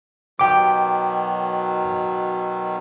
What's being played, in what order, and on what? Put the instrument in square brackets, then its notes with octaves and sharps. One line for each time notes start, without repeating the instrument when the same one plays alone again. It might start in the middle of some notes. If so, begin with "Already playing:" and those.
[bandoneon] B2 D#3 F#3 [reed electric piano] G5 D6